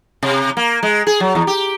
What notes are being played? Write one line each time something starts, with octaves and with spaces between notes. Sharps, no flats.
C3
A#3
G#3
G#4
F#3
E2
G4